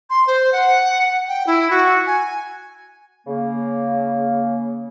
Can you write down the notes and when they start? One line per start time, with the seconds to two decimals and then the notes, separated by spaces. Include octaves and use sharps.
0.10 C6
0.27 C5
0.53 F#5
1.28 G5
1.47 E4
1.71 F#4
2.07 G#5
3.27 C#3 A#3